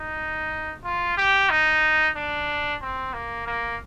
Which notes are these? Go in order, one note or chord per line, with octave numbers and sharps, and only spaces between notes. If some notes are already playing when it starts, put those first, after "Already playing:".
Already playing: D#4
F4
G4
D#4
D4
C4
A#3
A#3